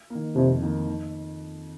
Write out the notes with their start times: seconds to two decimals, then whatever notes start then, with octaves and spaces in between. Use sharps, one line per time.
0.10 D#3 A#3
0.35 F2 C3
0.62 D#3 A#3
0.87 D#3